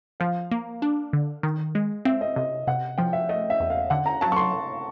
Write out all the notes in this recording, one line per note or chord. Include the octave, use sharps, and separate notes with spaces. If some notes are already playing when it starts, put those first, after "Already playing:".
F3 F5
A#3
D4
D3
D#3
G#3
C4 E5
D#5
C3 D#5
C3 F#5
F3 G5
E5
A3 D#5
E5
E2
F5
D3 F#5
A#5
F#3 A5
C#6
C6